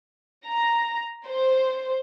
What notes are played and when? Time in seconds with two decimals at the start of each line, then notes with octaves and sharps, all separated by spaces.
0.46 A#5
1.25 C5